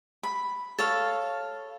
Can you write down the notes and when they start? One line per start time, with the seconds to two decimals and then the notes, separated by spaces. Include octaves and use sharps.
0.23 B5
0.79 A4 C#5 F5